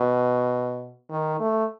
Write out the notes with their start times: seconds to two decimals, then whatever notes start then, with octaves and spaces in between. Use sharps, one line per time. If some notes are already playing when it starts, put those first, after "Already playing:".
Already playing: B2
1.10 D#3
1.40 A3